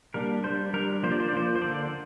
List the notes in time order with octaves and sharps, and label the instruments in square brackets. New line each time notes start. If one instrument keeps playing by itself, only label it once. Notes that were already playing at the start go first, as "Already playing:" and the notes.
[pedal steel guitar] G3 A#3 D4 A#4
G3 D4 C5
G3 D4 A#4
F3 A#3 D4 C5
D5
C5
D5
F3 A#3 D4 C5
C5
D3 A#3 D4 D5